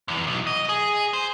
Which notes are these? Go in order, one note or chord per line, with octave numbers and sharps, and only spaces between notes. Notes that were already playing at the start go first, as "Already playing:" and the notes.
E2
B1
D#5
G#4
C5